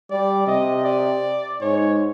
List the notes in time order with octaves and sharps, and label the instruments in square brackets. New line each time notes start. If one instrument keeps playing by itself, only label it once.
[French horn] G3 [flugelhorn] D5
[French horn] C3 [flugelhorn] D#5
[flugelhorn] D5
[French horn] G#2 [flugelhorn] C#5